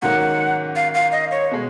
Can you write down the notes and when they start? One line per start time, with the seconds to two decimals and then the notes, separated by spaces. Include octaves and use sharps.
0.02 G#2 D#3 F#3 A#3 C#4 F#5
0.76 F5
0.94 F5
1.12 D#5
1.31 C#5
1.51 B2 G#3